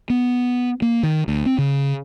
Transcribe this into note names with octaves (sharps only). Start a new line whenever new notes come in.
B3
A#3
D#3
D2
C4
C#3